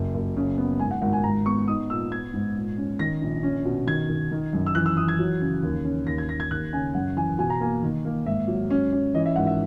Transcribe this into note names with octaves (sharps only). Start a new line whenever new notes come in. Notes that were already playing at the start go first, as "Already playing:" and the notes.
Already playing: F#1
F#1
C#3
B3
G#1 G#5
F#5
G#1 F#5
G#5
G#2 A#5
B3 C#6
D#4 D#6
A#2 E6
B3 G#6
G#2
A#2
C#4
D#3 A#6
A#1
C#4
B2
D#3 G#6
D#3
D#3
F#2
E6
E3 F#6
E6
E3 D#6
G#6
F#3
C#3
D#2
C#4
D#2 A#6
G#6
D#2 A#6
G#6
D#2 F#6
C#3 G#5
F#2 F#5
E3 G#5
B2 G#5
A#5
A#3 G#5
D#3
A#3
G#2 E5
F#3
C#4
C#4
E3 D#5
E5
G#1 F#5
E5